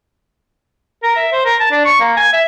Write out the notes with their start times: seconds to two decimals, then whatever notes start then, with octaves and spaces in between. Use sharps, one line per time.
1.03 A#4
1.16 E5
1.32 C5
1.45 A#4
1.60 A5
1.72 D4
1.85 C#6
2.00 A#3
2.17 G#5
2.33 E5